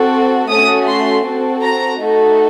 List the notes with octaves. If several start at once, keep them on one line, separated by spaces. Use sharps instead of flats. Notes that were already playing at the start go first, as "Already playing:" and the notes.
Already playing: C4 F#4 A4
A3 C#4 F#4 D#6
C6
C4 F#4 A4
A#5
A3 D#4 F#4 A4